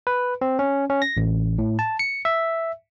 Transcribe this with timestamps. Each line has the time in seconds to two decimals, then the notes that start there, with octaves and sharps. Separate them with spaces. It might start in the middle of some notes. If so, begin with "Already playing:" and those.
0.07 B4
0.41 C4
0.59 C#4
0.90 C#4
1.02 A#6
1.17 A1
1.58 A2
1.79 A5
1.99 C#7
2.25 E5